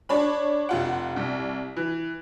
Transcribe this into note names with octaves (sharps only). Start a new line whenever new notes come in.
D4 C#5 B5
F1 F4 F#5
C2
E3